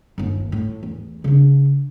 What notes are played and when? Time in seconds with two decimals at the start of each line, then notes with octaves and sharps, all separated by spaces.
0.18 G1 D#2
0.52 A2
0.83 E2
1.24 C#3 D4